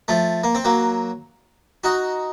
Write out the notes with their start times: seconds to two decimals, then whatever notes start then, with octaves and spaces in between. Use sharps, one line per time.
0.08 F3 A3
0.44 A#3
0.55 C4
0.65 F#3 A#3
1.84 D#4 F#4